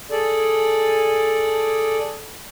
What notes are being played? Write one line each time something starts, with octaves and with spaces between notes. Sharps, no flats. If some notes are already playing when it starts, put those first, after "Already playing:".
G#4 A4 D5